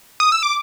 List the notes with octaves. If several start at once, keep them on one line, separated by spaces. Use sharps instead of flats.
D#6
E6
D6